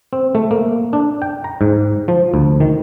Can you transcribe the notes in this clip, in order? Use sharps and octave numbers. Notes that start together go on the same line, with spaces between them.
C4
A3
A#3
D4
G5
A#5
G#2
F3
D2
D#3